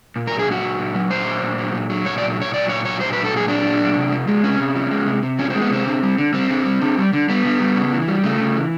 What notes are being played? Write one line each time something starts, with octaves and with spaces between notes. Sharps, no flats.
A#2
A#4
F#3
G#4
A#2 F#4
F#3
A#2
F#3
A#2 C5
F#3
A#2
F#3
A#2
F#3
A#2 C#5
D5
F#3
A#2 C#5
F#3 D5
A#2 C#5
F#3 C#5
A#2 C5
B4
F#3
A4
A#2 G#4
F#3 D4
A#2
F#3
C3
F3
G#3
C3 C#4
C3
F3
G#3
C3
C3
F3 C#4
G#3 C4
B3
C3 C4
D3
G3
D3
G3 C4
D3
G3
D3
G3
D3
G3 B3
D3
G3
C#3
E3
G3
C#3 A3
C#3
E3